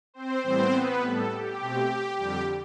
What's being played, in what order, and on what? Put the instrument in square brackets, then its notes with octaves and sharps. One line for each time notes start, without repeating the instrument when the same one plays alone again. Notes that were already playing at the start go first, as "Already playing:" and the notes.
[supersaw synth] C4 C5
A2 E3 G3 B3 C4 C5
B3 B4
A2 G3 B3 A4
G4
B2 A3 C4
F2 D3 G3 G4